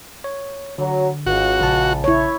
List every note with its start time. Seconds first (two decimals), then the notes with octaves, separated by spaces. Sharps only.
0.24 C#5
0.78 D3 F#3
1.26 G#1 C#2 F#4
1.60 A#1 C#3 A5
2.04 E4 C#5